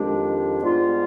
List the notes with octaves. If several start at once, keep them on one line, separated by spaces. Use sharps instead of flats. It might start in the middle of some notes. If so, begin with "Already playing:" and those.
Already playing: F2 D#3 G#3 D4 G4
G#2 G3 B3 F4